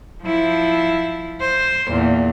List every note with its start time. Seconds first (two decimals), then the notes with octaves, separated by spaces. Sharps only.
0.22 F3 E4
1.41 C5
1.88 E2 A#2